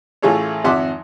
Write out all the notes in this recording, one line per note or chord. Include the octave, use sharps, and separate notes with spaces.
A1 A3 F4 G#4 A4 C#5
G#1 F2 E5 F#5 C6 D6